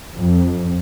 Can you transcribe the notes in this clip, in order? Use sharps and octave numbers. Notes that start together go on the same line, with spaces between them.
F2